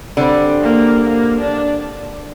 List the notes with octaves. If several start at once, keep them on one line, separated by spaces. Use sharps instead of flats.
D3 G3 C4
A#3
A#3
D4